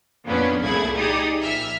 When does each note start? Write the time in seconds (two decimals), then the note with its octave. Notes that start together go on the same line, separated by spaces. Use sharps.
0.25 F2 A#2 B3 C#4 D4
0.61 C2 A#2 A3 E4 G#4 G#6
0.95 D#4 G4 G#4 D5 D#6
1.41 A#1 E5 F6